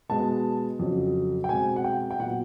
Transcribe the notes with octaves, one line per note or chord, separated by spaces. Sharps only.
B2 G#3 B3 A5
F2 C#3 F#3
G5
B2 G#3 C4 G#5
F#5
G5
G5
A#2 F#3 B3 F#5